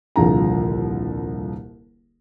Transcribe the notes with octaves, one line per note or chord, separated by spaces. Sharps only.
D#1 C2 D3 F3 G#4 A#5